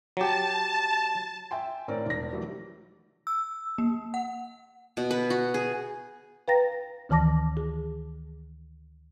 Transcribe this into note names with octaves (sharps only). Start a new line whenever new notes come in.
F#3 G4 A5
E5 G5 G#5 C6
A2 C4 A#4 C#5 D5
E1 A#6
D#3 E3 F#3 G3 A3
E6
A#3
F#5
B2
B4
F#4
G#4
B4 F5 G5 A#5 A6 A#6
D2 D#3 E3 A5 D6 A#6
G#4